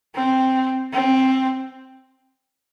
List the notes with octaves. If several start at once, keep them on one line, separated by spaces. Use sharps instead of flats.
C4
C4